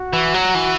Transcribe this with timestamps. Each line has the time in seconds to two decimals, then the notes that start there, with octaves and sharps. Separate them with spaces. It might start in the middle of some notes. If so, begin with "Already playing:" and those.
Already playing: F#4
0.13 E3
0.34 F#3
0.55 E3